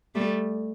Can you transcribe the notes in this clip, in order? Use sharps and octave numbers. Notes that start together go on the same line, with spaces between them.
G3 A3